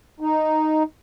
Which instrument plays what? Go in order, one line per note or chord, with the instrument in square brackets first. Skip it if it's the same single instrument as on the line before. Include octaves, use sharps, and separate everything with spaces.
[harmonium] D#4